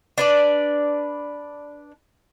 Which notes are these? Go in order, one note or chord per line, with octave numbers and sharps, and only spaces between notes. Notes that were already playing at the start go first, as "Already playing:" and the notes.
D4 B4 D5